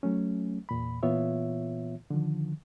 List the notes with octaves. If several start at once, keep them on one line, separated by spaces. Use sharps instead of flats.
F#3 A3 C#4
E2 A#2 B5
A#2 E3 B3 F4 C#5 E5
D3 D#3 F3